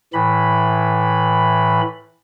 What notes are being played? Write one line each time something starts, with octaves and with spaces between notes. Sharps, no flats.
A2 E3 B5